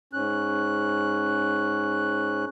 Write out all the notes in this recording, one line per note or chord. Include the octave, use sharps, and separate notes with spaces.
G#2 C#4 F#6